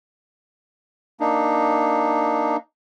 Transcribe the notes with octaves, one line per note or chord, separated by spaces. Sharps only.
A#3 D4 D#4